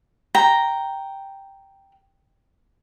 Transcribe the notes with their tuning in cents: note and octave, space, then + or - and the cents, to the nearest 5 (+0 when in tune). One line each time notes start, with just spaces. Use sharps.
G5 +0 A#5 +0